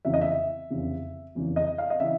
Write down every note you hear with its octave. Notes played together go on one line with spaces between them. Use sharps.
F1 E2 C#3 E3 E5
D#5
E5
F1 E2 C#3 E3
F1 E2 C#3 E3
D#5
F5
D#5
C#3 E3 E5